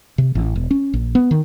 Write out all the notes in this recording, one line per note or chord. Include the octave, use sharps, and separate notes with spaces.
C3
A1
E1
C#4
A#1
B3
D#3